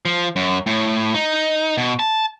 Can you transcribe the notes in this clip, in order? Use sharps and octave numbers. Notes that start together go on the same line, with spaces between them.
F3
F#2
A2
D#4
B2
A5